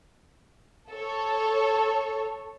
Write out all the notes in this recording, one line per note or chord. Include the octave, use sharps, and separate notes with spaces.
A4 C#5